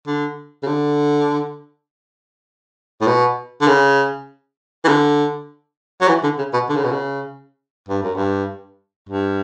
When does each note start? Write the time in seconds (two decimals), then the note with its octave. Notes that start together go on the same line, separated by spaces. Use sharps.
0.07 D3
0.63 C#3
0.67 D3
3.01 A2
3.08 B2
3.61 D3
3.68 C#3
4.85 E3
4.89 D3
6.01 F#3
6.08 E3
6.23 D3
6.38 C#3
6.53 B2
6.69 D3
6.76 C#3
6.84 B2
6.92 C#3
7.89 G2
8.03 F#2
8.16 G2
9.09 G2